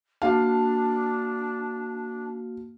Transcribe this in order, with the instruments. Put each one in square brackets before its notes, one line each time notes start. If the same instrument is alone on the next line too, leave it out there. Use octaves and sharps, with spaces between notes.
[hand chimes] A#3 F#4 A5 [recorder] D4 [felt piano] F5